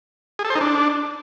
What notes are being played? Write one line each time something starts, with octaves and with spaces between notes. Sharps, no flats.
G#4
A4
C5
D#4
D4